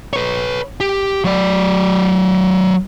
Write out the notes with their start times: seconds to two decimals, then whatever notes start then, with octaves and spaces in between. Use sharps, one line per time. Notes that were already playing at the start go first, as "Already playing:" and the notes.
0.13 B4 C#5
0.80 G4
1.24 F#3 D5